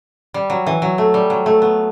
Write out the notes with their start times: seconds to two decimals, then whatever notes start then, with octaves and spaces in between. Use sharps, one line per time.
0.34 G3
0.50 F#3
0.66 E3
0.82 F#3
0.98 A3
1.14 G3
1.30 F#3
1.46 A3
1.62 B3